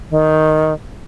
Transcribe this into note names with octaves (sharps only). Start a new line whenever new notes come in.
D#3